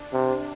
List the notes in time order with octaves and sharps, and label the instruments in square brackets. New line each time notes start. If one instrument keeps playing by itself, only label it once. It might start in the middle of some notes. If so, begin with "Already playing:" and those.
Already playing: [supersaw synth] D4
[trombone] C3